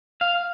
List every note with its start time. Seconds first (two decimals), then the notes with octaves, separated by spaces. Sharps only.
0.21 F5